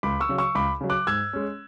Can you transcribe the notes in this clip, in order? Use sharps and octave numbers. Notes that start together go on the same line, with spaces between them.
C#2 B5 D6
C#6 E6
C#3 F#3
C#6 E6
C#2 B5 D6
C#3 F#3
D6 F#6
G#2 E6 G#6
G#3 C#4